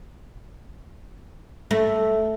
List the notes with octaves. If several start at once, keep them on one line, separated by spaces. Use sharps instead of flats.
A3